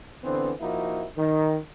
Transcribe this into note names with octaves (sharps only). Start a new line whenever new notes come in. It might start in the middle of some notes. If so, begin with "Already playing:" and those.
D3 E3 B3 C4
F3 A#3 D#4 E4 F#4
D#3